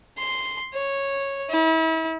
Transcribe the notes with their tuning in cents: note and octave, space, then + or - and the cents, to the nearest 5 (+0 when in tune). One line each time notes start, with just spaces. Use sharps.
C6 -5
C#5 -10
E4 -35